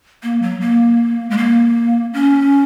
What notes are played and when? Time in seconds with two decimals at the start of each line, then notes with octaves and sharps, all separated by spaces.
0.23 A#3
0.42 F#3
0.61 A#3
1.30 G#3
1.38 A#3
2.13 C#4